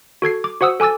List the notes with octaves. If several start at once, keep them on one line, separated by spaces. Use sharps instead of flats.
F#4 A4 G#6 C7
D6
F#4 C5 F#5 D#6 E6
A4 G#5 D6 E6 A6